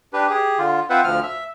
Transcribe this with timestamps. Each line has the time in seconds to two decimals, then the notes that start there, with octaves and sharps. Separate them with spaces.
0.13 D4 G4 B4
0.30 G4 G#4
0.59 D3 F4
0.90 C4 F4 B4 C5 E5 F#5
1.04 D2 F3 F6
1.23 E5